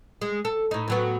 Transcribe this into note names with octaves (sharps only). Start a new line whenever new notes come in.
G#3
A4
A2 D#4
A2 F#3 B3